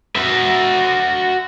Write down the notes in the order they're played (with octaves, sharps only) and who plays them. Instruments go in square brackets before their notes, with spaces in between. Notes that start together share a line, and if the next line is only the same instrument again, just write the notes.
[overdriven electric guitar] F#4 E5